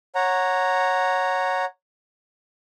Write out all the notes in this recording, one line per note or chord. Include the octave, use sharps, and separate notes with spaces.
C#5 F#5 A#5